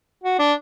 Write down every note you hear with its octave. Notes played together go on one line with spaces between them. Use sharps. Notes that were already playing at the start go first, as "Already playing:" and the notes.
F#4
D4